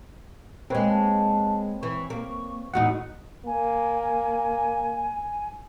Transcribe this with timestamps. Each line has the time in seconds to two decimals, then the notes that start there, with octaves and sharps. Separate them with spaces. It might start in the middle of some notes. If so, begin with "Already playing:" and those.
0.70 G#3 A#3 C4 B4 C#5
0.89 A5
1.83 E3 C#6
2.10 A#3
2.74 E2 A2 D#4 F#4 F#5
3.46 A#3 G#5